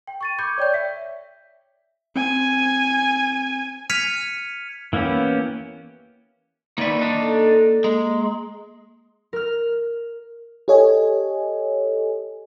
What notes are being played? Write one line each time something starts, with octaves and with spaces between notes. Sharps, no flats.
G5
C#6 A6 D#7
B5 C#6 D6 G6 G#6 C#7
C#5 D5 G5 G6
E5 B6
C4 G#5
F6 G#6 B6 C#7 D#7 F7
E3 A#3 B3 C#4 G4
D#3 A#3 B4 D5 E5
D4 D#4
A4
G#3 A#3
A#4 F6
G4 A4 C#5 D#5 G#5